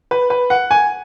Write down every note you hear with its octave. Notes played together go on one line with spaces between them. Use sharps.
B4
B4
F#5
G#5